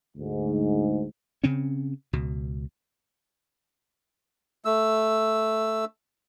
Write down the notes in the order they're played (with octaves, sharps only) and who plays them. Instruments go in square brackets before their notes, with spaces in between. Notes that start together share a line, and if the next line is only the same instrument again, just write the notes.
[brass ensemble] D2 G#2
[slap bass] C#3 C4 C#4
C#2 B2
[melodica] A3 E6